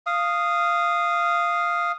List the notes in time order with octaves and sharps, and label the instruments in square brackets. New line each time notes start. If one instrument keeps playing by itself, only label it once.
[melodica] F5 D#6